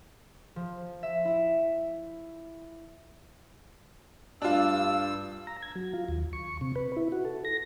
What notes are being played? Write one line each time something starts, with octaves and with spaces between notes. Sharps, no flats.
F3
E5
E4
G2 D4 F4 E6
A#5
G#6
F#3
F4
D#2
C#6
C3
B4
E4
F#4
A4
A#6